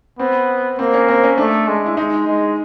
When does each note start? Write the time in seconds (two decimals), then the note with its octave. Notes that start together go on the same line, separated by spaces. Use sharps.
0.19 B3 C4
0.79 A#3 C4
0.94 C#4
1.08 C4
1.23 C#4
1.38 A3 D4
1.68 G#3
1.86 E4
1.97 G#3 D#4
2.27 G#3